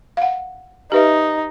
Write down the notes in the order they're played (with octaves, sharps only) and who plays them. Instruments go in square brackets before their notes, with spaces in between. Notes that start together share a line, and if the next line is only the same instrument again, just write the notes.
[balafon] F5 F#5
[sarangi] D#4 [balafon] G4 B4 E5